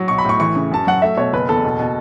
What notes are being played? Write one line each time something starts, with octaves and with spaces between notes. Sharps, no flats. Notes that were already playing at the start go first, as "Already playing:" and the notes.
Already playing: F#3
B1 C#6
B5
A2 C#6
E3 C#6
C#3
F#2 A5
F#3 F#5
A3 E5
B2 C#5
F#1 B4
E2 A4
B2
B2